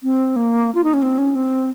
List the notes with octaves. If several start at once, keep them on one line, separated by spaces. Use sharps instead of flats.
C4
A#3
F4
D#4
C#4
C4
C#4
C4